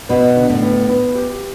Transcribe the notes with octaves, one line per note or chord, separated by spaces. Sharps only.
B2 B3
D3
A2
B3
B3
G4